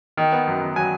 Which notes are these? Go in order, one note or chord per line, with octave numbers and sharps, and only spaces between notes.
D#3
B3
F#2
D#3
F#3 G#5